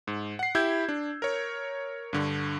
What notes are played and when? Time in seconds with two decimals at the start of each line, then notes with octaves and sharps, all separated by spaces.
0.07 G#2
0.39 F#5 C7
0.55 E4 G4 E6 G6 G#6
0.89 D4
1.22 A#4 C#5
2.13 G2 D3 C#6